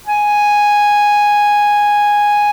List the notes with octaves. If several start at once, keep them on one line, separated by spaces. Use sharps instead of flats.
G#5